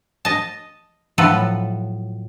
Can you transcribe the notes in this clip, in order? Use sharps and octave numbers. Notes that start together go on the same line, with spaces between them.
D#5 A5
A2 F3 F#3 A4 B4 E5